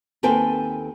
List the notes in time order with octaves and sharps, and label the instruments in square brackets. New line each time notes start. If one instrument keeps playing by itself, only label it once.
[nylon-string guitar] D#2 C4 A4 B4 G5 G#5